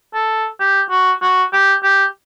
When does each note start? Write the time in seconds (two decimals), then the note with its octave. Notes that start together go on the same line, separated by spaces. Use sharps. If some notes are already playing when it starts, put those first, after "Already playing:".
0.14 A4
0.60 G4
0.90 F#4
1.22 F#4
1.53 G4
1.83 G4